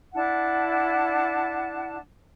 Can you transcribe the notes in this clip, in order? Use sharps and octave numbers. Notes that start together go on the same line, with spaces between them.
D4 E4 F#5 A5